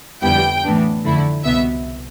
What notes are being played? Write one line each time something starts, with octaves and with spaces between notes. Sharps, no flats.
F2 D3 G3 B3 E4 G5
A2 E3 B3 D4
F2 D3 A3 E4
C2 B2 B3 E5